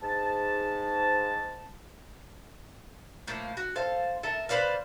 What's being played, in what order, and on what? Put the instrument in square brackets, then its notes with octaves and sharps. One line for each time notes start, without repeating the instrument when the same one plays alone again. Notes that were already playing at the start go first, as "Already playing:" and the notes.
[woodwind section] G#2 A5
[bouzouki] A2 F3 A#3
F#4
A4 C5 F5
A4 A#4 E5
B4 C5 D5 F5